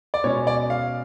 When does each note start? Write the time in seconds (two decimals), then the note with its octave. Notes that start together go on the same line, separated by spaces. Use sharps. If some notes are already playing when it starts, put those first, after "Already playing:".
0.14 D5
0.24 B2 G#3 C#4 C#5
0.47 D5
0.70 F5